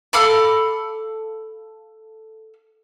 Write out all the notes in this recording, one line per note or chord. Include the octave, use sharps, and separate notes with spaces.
A4 F5 B5 D6